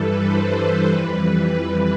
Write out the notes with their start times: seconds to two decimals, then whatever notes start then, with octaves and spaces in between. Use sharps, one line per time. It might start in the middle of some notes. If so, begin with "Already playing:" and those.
Already playing: G2 E3 G3 A4 B4
0.25 C5
0.57 B4
0.89 F2 E3 G3
1.54 B4